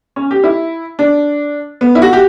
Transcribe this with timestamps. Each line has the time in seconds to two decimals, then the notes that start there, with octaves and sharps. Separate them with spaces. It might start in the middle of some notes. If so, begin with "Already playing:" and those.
0.16 C#4
0.31 G4
0.44 E4
0.99 D4
1.81 B3
1.95 E4
2.02 F#4
2.13 G4